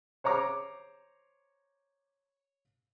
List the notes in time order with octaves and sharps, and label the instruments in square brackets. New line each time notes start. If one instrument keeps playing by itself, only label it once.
[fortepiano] C5 C#5 A#5 D6